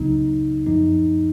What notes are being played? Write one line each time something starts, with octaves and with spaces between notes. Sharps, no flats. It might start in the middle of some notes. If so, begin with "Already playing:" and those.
Already playing: C#2 C#3 F#3 B3 D#4
F#2 F3 B3 D#4